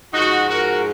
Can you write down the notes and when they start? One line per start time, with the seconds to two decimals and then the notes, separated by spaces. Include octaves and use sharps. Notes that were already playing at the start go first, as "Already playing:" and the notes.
0.13 G#2 F3 G#3 D#4 F#4
0.48 F#4 A#4